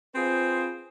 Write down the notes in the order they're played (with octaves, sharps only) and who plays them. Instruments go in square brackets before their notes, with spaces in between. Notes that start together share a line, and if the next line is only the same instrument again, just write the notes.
[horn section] C4 F4 G#4 B4 C5